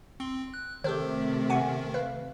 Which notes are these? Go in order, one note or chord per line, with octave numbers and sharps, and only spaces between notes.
C4 C6
F#6
C3 D#3 A3 G4 A4 C5
F#5 G#5 C#6
B4 F5